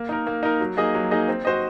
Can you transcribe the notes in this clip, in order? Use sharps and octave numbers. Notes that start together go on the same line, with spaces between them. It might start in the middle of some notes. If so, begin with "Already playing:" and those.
Already playing: A#3
D#4 A#4
A#3
D#4 A#4
F#3
A#3 D#4 G#4 D#5
F#3
A#3 D#4 G#4 D#5
C4
F#4 C5 D#5